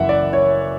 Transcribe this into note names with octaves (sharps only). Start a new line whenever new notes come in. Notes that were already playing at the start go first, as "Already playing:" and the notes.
Already playing: F#1 F#2 E3 E5 F#5
D5
C#5